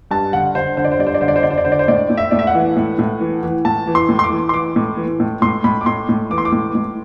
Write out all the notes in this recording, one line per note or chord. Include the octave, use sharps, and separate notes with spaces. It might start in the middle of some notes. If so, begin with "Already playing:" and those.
G2 A5
D3 F#5
D3 C5
D3 C5
D5
C5
G2 D5
C5
D5
D3 C5
D5
C5
D3 D5
C5
D5
D3 C5
D5
C5
A2 D5
A2
E5
A2 D5
E5
F#5
E3
A2
A2
E3
E3
A2 A5
E3
C6
A2
C6
D6
E3
C6
E3 D6
A2
E3
A2
A2 C6
A2 B5
D6
A2 C6
A2
E3 D6
C6
D6
A2
A2